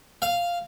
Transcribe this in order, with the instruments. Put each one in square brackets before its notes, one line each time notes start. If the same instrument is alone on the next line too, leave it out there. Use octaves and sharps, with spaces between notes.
[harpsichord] F5